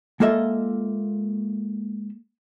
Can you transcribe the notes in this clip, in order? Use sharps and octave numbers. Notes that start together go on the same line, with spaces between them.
G#3 A#3 F4 A4 D#5 E5